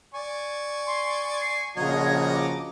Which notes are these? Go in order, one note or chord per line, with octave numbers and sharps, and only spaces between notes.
D5 G#5 C#6
C6
C7
A#1 C#3 F3 F#4 D#5 A#5 G#6
D6